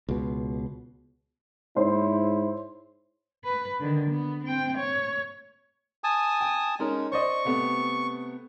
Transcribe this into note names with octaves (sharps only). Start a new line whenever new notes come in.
C#2 B2
G#2 E4 C5 C#5 C6
B4
D3 D#3
B3
C4 G5
C#5
G#5 A5 D#6
G5
G#3 C#4 D#4 A#4
C5 D5 D#5 C#6
C3 A3 B3